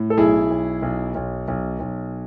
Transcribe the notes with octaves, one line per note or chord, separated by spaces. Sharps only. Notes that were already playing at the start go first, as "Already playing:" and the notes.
Already playing: A2
A4
B1 E4 G#4
B1
B1
B1
B1
B1